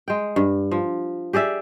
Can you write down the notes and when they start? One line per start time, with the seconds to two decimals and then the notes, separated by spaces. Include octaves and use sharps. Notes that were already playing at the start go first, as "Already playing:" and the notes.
0.08 G#3 G5
0.36 G2
0.71 F3
1.33 G4 G#4 D5 E5